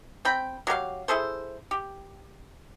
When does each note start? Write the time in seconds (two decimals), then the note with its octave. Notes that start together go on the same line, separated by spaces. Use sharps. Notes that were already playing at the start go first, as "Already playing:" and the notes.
0.25 C4 G5 B5
0.67 F#3 G4 A#4 F5
1.08 E4 G#4 A4 C5
1.71 G4